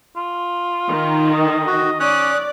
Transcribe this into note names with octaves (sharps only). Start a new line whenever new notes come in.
F4
D#3
D#5
F#4
C#4 D5 D#6 F#6